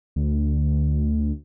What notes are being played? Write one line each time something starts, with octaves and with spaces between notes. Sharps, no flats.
D2